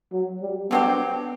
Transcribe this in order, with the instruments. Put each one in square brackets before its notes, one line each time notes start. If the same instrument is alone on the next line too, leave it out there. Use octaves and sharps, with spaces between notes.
[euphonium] F#3
G3
[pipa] D3 F#3 C4 G4 [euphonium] B3